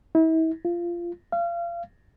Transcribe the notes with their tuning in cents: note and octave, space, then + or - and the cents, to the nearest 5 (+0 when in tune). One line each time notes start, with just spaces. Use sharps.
E4 -40
F4 -15
F5 -30